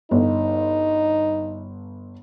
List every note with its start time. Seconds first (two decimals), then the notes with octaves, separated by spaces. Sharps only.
0.11 G1 D#4